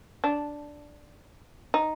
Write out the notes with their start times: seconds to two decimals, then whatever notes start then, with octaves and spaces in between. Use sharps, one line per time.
0.24 D4
1.74 D#4